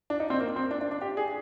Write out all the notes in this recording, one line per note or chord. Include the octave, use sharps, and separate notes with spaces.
D4
D#4
C4
A#3
C4
D4
D4
D4
G4
G#4